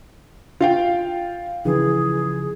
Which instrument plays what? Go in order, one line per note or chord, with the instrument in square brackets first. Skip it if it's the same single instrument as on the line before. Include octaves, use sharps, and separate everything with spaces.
[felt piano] F4 F5 G5
[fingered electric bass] C#3 F3 [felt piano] E3 [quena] G#4